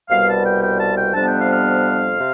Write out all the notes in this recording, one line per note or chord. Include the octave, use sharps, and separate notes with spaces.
C2 B2 G3 B3 F5
A5
G5
G5
A5
G5
F2 C3 G3 B3 D4 A5
G5
F5
F5
C3